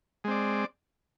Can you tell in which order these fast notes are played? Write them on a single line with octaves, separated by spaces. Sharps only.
G#3 C4 D5